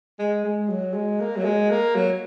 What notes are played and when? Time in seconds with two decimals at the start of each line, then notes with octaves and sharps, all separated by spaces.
0.19 G#3
0.44 G#3
0.69 F#3
0.94 G#3
1.20 A#3
1.37 F#3
1.45 G#3
1.70 A#3
1.95 F#3